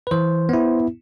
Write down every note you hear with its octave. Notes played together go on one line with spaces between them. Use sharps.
B4
E3 C5
B3 E4